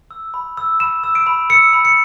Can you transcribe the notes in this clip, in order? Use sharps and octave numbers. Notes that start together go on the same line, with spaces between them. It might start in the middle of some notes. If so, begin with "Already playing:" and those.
E6
B5
E6
B5 E7
E6
D7
B5
E6 C#7
B5
C#7